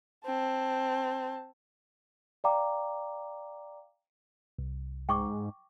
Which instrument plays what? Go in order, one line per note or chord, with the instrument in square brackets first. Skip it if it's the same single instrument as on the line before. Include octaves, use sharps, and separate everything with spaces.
[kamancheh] C4 A5
[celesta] D5 F5 G5 A#5 D6
[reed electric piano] C2
[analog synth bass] G#2 [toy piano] G5 C#6 D6